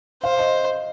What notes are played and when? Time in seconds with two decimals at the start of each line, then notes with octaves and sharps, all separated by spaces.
0.23 C5 F5
0.39 D#5